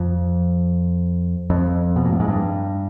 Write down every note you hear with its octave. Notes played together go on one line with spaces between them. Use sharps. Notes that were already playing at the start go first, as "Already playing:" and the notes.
Already playing: F2
F2
B2
A#2
A2
G#2
G2